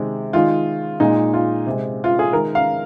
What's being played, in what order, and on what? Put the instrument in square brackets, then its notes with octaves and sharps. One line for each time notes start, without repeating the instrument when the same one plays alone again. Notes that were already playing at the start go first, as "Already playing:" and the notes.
Already playing: [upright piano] C3 D#3 G#3
D#3 G#3 F4
A#2 G#3 D#4
F4
C3 G#3
F4
G#4
D#3 G#3 A#4
F5